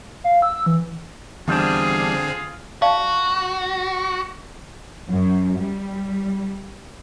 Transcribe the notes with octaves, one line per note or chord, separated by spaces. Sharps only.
F5
E6
E3
E2 D3 G3 C4 D4 F4 G#4
F#4 D5 F5 A5
F#2
G3